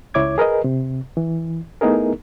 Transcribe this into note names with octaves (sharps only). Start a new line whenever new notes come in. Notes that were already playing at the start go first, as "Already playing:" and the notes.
C#2 E4 C#5 D6 G#6
G#4 A#4 B4 D#5
C3
E3
A3 B3 D#4 E4 G#4 A#4